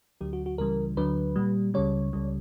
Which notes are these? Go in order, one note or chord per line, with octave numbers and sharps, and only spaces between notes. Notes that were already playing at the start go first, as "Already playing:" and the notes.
D2 D3 F#3 G4
F#4
F#4
C#2 C#3 E3 G3 A#4
D2 D3 F#3 B4
A#2 G3
C#2 C#3 G3 C#5
C#2 C#3 G3